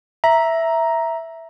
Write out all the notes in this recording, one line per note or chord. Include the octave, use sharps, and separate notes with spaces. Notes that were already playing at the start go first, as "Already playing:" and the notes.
E5 A#5